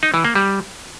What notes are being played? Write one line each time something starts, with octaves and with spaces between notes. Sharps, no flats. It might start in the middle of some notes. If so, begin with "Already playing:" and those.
D#4
E3
A#3
G3